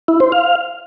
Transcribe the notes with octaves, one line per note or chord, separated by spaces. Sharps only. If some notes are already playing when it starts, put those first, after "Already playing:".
E4
C5
F5